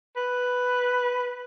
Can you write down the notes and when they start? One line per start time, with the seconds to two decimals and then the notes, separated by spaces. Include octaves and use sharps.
0.17 B4